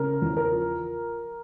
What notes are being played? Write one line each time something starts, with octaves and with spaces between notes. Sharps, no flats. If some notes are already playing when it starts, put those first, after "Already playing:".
Already playing: C#3 A#4
E2
A#4
F3